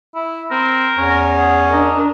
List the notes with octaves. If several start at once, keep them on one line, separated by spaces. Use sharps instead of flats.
E4
C4 A#4
E2 C#4
G#4 F#5
D4 A#4 D#5